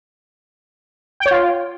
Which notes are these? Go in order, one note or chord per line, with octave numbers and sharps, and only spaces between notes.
G5
C#5
F4